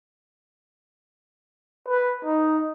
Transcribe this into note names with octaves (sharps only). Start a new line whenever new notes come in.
B4
D#4